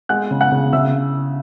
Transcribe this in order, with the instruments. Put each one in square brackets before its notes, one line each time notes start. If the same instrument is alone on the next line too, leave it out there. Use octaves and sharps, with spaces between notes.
[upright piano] G#3 F#5 F#6
C#3
F#5 F#6
C#3
C#3 E5 E6